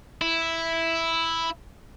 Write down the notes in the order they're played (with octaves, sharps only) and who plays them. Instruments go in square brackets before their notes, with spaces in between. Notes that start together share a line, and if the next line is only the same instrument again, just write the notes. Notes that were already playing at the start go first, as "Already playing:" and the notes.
[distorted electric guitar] E4